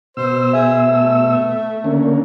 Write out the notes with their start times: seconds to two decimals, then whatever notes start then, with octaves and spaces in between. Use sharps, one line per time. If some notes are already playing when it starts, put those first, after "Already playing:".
0.17 B2 C5 E6
0.53 G#4 E5
0.88 A3
1.84 D3 A#3 C#4